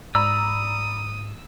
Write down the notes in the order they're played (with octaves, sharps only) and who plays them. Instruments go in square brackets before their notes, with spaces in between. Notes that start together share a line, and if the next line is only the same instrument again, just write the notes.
[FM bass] G#2 [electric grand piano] D5 A#5 B5 [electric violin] D#6 [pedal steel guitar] E6